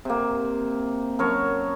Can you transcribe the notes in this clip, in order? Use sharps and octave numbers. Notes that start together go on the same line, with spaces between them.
C3 A#3
F#2 A#4 C#5 A5